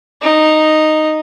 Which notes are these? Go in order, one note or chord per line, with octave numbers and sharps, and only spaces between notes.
D#4